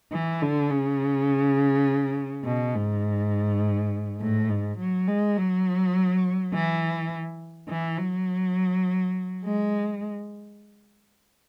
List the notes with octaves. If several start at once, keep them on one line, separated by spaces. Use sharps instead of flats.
E3
D3
C#3
B2
G#2
A2
G#2
F#3
G#3
F#3
E3
E3
F#3
G#3